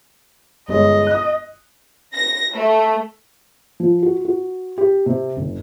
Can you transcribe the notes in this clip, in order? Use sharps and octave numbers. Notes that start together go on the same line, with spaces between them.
G1 G#3 C#5 D#5
D#6 F#6
A#6
A3
F3
F#4
F#4
G4
C3
F#1